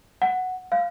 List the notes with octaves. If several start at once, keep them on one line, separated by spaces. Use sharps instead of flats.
F#5
F5